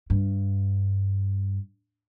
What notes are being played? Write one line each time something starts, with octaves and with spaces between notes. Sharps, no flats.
G2